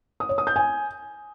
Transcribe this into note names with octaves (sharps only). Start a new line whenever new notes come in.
D#6
C#5
D#6
G6
G#5